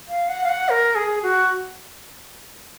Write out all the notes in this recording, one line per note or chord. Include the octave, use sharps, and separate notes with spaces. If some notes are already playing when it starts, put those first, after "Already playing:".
F5
F#5
F5
F#5
A#4
G#4
F#4